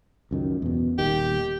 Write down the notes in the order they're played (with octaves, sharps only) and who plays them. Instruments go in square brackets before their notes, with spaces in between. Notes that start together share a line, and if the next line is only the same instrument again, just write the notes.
[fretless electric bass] C#2 F#2 D#3
E2 B2
[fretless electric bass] D#1 D#3 [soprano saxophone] G4